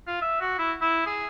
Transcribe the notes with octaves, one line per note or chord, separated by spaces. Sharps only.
F4
E5
F#4
E4
E4
G#4